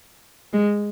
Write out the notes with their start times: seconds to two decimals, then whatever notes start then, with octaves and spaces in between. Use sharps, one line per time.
0.53 G#3